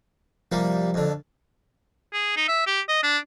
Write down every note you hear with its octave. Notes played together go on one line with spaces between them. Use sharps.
C2 F3 G3 A#3
F2 D3
G#4
D#4
E5
G4
D#5
D4